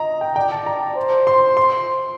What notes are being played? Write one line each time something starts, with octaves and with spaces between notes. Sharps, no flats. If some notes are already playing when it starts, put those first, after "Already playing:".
Already playing: D#5 A#5
G5
D5 G5
A5
A#5
C5
C6
C6